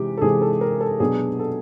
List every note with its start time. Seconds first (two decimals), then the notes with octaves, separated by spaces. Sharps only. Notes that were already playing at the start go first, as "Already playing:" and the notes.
Already playing: C3 E3 G#3 G4
0.17 A4
0.22 C3 E3 G#3 G#4
0.42 A4
0.61 A#4
0.81 A4
1.00 B2 F#3 B3 D4 G#4
1.39 A4